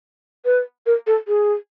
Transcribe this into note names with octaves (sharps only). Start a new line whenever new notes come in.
B4
A#4
A4
G#4